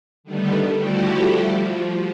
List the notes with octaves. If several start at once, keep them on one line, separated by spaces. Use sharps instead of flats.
D3 D#3 G3 A3 B3
F3 G3 A3 E4 F#4 G4
F3